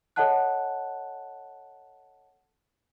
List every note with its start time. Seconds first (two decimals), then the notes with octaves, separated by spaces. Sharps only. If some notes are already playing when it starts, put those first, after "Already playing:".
0.16 A4 C#5 D#5 F#5 A5 F#6